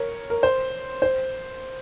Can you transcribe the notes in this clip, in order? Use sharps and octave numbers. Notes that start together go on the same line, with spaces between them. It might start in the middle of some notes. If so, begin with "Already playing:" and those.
Already playing: A#4 C#5
A#4
C5
C5